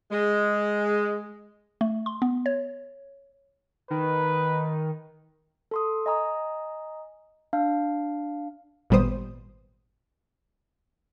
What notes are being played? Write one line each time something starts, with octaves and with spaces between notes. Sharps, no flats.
G#3
A3
C6
B3
C#5
D#3 B4
A4 C6 D#6
D#5 G#5 A#5 D#6
D4 F5
G#1 A#2 G3 B3 C5 D#6